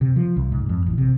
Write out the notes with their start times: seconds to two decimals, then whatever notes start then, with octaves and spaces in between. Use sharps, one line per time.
0.01 C3
0.16 F3
0.36 C2
0.52 G#2
0.69 F2
0.86 A1
0.98 C3